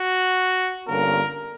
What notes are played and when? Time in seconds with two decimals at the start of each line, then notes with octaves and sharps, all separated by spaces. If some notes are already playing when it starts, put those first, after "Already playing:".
Already playing: F#4
0.87 G1 G2 D3 A#3 C#4 A#4